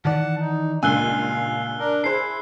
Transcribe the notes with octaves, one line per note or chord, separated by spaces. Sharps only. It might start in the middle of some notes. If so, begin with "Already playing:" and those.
D#3 E3 D5 F#5 A5
D#4
C#2 G2 A#2 F5 G#5 E6 F#6 G7
D4 A#4
E4 G#4 C5 C7